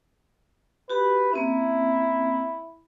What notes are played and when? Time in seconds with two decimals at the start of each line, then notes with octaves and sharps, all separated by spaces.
0.90 F#4 G4 B4
1.33 A#3 C4 C#4 E4